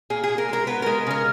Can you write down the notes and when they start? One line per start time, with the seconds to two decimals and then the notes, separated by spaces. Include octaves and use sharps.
0.10 A#2 G#4
0.24 G#4
0.29 A#2
0.38 A#4
0.49 G#3 A#4
0.67 B3 B4
0.82 G#3 A#4
1.07 C#3 A#4